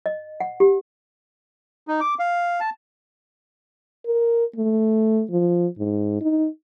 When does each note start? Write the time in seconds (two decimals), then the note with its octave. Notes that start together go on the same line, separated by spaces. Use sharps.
0.06 D#5
0.40 F#5
0.60 G4
1.88 D#4
2.01 D6
2.19 F5
2.60 A5
4.06 A#4
4.56 A3
5.31 F3
5.78 G#2
6.21 D#4